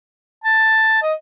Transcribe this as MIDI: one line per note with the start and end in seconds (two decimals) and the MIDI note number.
0.44 0.98 81
1.02 1.14 75